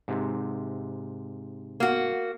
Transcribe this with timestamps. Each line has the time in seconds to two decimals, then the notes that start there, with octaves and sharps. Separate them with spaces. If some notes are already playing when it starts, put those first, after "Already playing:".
0.08 G#2 C3
1.80 A#3 F#4